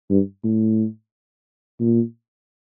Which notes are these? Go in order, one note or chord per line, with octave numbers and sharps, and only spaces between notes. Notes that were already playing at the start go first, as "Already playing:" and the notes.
G2
A2
A#2